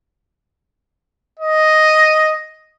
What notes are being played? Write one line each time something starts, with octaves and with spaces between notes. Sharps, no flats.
D#5